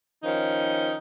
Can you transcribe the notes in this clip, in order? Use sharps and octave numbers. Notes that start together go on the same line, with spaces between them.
D#3 F3 C#4 D#4